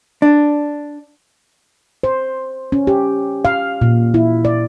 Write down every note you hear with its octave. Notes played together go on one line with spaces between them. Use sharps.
D4
C5
C#4
G4
F5
A#2
E4
D5